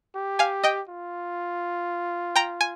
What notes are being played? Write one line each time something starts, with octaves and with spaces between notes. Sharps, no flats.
G4
F5 G#5
D#5 G5
F4
G5 A#5
G#5